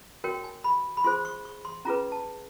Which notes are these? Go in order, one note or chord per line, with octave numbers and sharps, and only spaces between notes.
F#4 A#4 C#5 G5
G5
G#5
B5
B5
F4 G#4 C5 C6
C#6
C#6
C6
C#4 F4 G#4 B4 A#5
A5